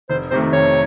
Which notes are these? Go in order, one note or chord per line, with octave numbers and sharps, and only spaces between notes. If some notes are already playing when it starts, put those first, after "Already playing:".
F1 C5
F2 C3 D#3 A3 C5
F1 C#5